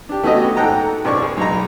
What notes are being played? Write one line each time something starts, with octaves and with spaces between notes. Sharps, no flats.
D4 G4
A3 B3 C#4 F#4 G4 D#5
G#2 A4 F#5 G5 A#5
C2 G2 D5 C#6
G#4
B1 G#3 A#5